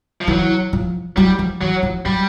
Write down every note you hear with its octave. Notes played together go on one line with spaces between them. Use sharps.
F3
E3 F#3
F3
F#3 G3
F3
E3 F#3
F3
F#3 G3